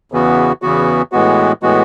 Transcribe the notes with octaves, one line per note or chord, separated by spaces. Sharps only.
E2 C#3 E3 B3 F#4
E2 C#3 E3 B3 F#4
A2 E3 G#3 B3 F#4
A2 E3 G#3 B3 F#4